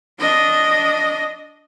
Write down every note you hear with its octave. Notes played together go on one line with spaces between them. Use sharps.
D4 D#5